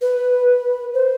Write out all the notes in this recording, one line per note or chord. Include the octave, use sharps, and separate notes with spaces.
B4
C5